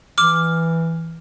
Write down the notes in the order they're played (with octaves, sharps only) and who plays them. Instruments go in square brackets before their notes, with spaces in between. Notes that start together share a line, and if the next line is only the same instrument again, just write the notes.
[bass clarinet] E3 [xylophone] D6 F6